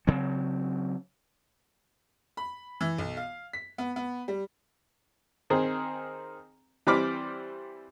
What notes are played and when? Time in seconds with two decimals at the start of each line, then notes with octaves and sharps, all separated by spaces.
0.07 C#3 F#3 C4
2.37 B5
2.81 E3
2.98 B1
3.17 F5
3.53 B6
3.78 B3
3.96 B3
4.28 G3
5.50 D#3 C4 G#4
6.87 E3 G3 C4 B5 D6 F6